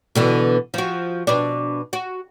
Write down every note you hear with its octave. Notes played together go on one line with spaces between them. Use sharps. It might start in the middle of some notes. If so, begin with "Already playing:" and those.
B2 D3 E3
F3 F#4
B2 D4
F#4